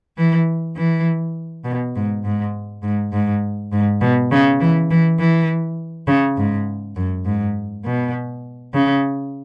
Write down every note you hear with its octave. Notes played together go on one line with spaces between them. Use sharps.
E3
E3
B2
G#2
G#2
G#2
G#2
G#2
B2
C#3
E3
E3
E3
C#3
G#2
F#2
G#2
B2
C#3